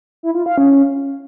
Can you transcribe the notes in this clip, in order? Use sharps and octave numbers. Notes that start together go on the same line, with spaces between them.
E4
F4
F5
C#4